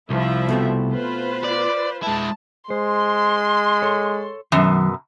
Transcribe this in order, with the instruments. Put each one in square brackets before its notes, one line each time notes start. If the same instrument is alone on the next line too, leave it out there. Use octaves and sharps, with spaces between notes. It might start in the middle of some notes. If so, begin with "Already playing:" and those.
[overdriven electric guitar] C2 [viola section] F3 E4 E5
[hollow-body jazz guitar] B2 A3 C4
[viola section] F4 B4 C5
[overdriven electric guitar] D5
[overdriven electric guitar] G#3 E4 [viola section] A5
[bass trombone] G#3 [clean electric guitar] C5 [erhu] C6
[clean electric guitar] A4 C#5
[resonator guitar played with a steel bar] F#2 B2 [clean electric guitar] D#3 F#3